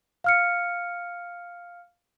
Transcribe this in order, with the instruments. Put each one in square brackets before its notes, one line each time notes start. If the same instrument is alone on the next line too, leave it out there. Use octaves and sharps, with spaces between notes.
[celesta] F5 F6 C#7